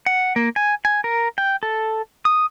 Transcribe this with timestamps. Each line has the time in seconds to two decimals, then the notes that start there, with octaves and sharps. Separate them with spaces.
0.06 F#5
0.36 A#3
0.56 G#5
0.85 G#5
1.04 A#4
1.38 G5
1.63 A4
2.25 D#6